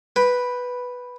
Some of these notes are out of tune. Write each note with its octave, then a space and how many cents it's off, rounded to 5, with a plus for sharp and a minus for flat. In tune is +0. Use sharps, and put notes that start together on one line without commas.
B4 +0 G5 +15